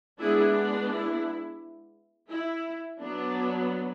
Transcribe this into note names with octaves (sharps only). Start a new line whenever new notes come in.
G#3 B3 D4 E4 G#4
E4
E4
F#3 B3 D4